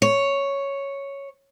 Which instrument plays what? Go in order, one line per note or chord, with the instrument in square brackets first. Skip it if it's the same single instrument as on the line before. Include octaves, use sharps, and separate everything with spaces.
[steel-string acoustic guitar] C#5